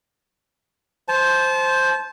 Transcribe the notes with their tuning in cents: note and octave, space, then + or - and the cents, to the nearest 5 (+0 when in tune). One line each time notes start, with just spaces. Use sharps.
C5 +0 A5 -30